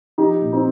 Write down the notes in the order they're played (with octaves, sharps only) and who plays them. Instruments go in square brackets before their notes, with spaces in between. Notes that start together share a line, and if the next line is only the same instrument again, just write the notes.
[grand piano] F3 D#4 G4
A#2
C4 D#4